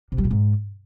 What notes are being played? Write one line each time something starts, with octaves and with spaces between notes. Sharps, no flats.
C3
G3
A#2
G#2